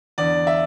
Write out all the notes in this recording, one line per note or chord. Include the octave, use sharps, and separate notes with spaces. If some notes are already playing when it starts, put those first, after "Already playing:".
E2 D3 D5
E5